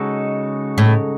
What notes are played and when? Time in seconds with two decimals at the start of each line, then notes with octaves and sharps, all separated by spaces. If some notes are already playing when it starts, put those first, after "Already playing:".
Already playing: C#3 G#3 D#4 F#4 A4
0.78 A2